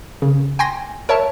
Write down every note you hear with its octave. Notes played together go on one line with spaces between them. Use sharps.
C#3
G5 G#5 C6 A#6
A#4 C#5 E5 A5